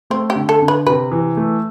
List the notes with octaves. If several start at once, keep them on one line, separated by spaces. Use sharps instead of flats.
A3 C4
G4
D3
A4
D3
B4
C3 B4
E3
A3